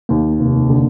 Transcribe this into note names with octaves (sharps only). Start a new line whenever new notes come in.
D#2 A#3
F1
D3